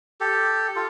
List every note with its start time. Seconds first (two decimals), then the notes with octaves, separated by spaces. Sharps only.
0.21 G4 A4
0.76 F4 A4